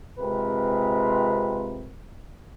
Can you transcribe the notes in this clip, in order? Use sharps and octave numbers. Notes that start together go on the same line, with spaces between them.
C3 G#3 C4 F4 A#4 B4